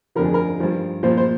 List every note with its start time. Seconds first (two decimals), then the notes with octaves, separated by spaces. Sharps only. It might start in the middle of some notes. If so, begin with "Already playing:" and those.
0.15 F2 D3 F3 A#4
0.25 G#4
0.34 A#4
0.60 G2 F3
1.03 A#2 F3 C5
1.17 C5